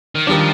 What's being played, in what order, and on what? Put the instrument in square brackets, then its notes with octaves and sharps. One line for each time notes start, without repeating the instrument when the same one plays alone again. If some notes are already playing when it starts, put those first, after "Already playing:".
[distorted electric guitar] D#3
[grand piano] D#3 G3 D4 [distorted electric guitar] F3